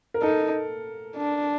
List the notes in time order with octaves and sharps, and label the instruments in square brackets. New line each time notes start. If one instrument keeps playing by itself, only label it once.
[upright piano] A#4
[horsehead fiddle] D#4 [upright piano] A4
[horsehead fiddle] D4